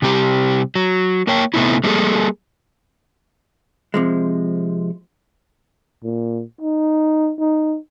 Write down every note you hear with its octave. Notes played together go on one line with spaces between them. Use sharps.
C3 G3 C4 G4
F#3
A#3 A#4 C#5 G5
C3 A3 B3 C4 D#4 E4
G3 A#3 D#4 F#4 G#4 A4
C3 F3 G#3
A#2
D#4
D#4